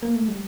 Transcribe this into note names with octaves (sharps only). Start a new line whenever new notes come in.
A#3
A3
G3